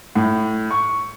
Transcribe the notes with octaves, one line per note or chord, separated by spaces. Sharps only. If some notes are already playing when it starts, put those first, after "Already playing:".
A2
C#6